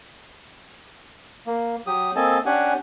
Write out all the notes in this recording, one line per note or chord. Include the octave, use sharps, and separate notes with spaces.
A#3
F#3 G4 D#6
A#3 C4 A4 D#5 G#5 A5
C#4 D4 G4 F#5 G#5